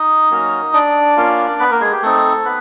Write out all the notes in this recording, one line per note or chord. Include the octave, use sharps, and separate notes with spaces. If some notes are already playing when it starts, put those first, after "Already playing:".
Already playing: D#4 D#5
F#3 A#3 C#4 F#4
D4 D5
A#3 C#4 F4
B3 B4
A#3 A#4
G#3 G#4
G4
A3 C4 D#4 A4
B3 B4